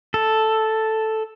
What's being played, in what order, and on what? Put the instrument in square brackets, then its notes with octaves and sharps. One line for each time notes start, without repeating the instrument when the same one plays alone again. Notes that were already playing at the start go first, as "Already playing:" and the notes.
[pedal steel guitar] A4